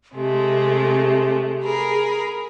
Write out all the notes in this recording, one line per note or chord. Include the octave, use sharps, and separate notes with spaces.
C3 G#3 A3 G4
G#4 A#4 B5